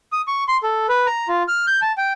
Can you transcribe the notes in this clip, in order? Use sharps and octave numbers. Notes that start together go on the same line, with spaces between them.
D#6
C#6
C6
A4
B4
A#5
F4
F6
G6
A5
G5